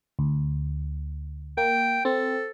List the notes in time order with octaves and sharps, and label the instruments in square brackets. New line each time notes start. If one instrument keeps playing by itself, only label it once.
[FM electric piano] D2
[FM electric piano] A#3 [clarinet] G5
[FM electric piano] C4 [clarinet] A4